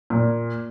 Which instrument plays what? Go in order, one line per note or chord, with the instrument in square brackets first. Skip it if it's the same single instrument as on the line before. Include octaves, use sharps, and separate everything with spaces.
[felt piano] A#2